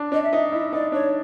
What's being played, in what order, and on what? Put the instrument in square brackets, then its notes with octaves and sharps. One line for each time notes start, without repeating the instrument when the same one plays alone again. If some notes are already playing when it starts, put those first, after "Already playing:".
Already playing: [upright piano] D4
[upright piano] D4 [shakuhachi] D#5
[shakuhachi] E5
[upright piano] D#4
[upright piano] E4 [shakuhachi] D#5
[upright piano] D#4 [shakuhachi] D5
[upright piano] D4 [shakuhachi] C#5